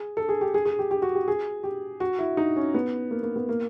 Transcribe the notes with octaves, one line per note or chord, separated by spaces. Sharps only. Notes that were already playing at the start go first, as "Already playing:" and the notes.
Already playing: G#4
A4
G#4
G4
G#4
G#4
G4
G4
F#4
G4
G#4
G4
F#4
E4
D#4
C#4
B3
A#3
A#3
B3
A#3